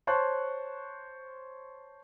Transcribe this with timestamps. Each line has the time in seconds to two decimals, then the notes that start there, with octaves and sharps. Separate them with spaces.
0.07 C5 C#5 A5 C6 C#6 F#6